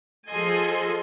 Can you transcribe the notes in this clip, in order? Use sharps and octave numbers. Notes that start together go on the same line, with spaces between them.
F3 G#4 A4 D#5 G#5 C6